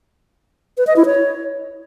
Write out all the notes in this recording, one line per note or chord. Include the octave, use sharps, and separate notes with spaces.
B4
D#5
E4
C#5